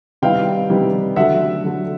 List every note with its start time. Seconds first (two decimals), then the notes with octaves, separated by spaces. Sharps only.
0.22 C3 D#3 G3 B3 E4 F5 G5
0.70 C3 D#3 G3 B3 E4
1.16 D3 F#3 A3 E5 F#5
1.64 D3 F#3 A3